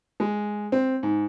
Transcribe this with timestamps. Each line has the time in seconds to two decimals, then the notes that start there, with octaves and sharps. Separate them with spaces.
0.20 G#3
0.72 C4
1.03 G#2